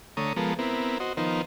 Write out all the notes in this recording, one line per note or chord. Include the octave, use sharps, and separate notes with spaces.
D3 A3 C#5 A#5 D#6
F3 G#3 B3 A4 A#4
B3 C4 E4 A#4
F#4 C5 D#5
D#3 F3 B3 D#4 A#4 C5